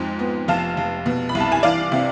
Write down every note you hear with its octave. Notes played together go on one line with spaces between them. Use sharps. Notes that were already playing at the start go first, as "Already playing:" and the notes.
Already playing: F2 G#2
B3
F1 F5 A5
F1
B2
B5
C2
A5
G#5
E3 D5 F5
C3